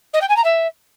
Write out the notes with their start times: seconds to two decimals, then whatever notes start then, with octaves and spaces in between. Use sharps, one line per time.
0.13 D#5
0.21 G5
0.29 G#5
0.36 A#5
0.44 E5